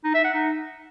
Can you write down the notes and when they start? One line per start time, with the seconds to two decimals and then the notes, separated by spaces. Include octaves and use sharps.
0.04 D#4
0.14 E5
0.24 F#5
0.34 D#4